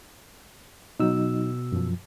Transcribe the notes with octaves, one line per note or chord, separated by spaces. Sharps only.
B2 F#3 D#4 E6
F#2 F3